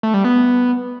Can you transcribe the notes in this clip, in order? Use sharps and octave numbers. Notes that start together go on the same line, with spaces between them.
A3
G3
B3